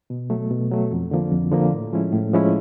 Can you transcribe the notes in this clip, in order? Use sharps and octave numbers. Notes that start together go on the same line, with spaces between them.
B2
F#3 A3
B2
F#3 A3
F2
D3 F3 A#3
F2
D3 F3 A#3
A2
F3 G#3 C#4 E4
A2
F3 G#3 C#4 E4